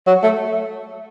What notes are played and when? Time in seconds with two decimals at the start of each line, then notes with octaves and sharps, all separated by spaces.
0.07 F#3
0.23 A3